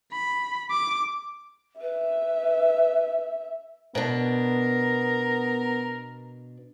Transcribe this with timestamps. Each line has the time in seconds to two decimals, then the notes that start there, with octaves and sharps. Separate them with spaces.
0.12 B5
0.71 D6
1.81 B4 E5
3.95 B2 B3 D4 A#4